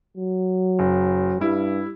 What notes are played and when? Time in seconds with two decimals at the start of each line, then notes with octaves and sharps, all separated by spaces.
0.17 F#3
0.79 F#1
1.40 G2 G3 E4